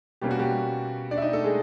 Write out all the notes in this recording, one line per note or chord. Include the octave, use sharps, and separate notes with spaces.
B2 G3 A#3 C#4 G4
F#4
G3 G4
D4 D5
E5
D#4 D#5
A3 A4
G#3 G#4